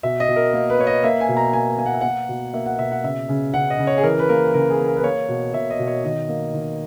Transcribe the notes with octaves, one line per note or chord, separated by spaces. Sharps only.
B2 E5
D#5
B2
A#4
A#3
B4
A#3 C#5
D#5
A#3 E5
G#5
B2
A#5
A#3 G#5
A#3 G#5
F#5
E5
A#3 F#5
B2
A#3 E5
F#5
B2 E5
F#5
C#3 E5
C#3
C#3 F#5
D#5
C#3
C#5
G#4
E3 A#4
B4
A#3 A#4
C#3 A#4
G#4
A#3
A#4
B4
A#3 C#5
B2
B2 E5
D#5
B2
C#5
D#3 D#5
A#3
D#3